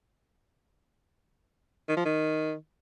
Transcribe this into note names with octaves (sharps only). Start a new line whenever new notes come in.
D#3
F3
D#3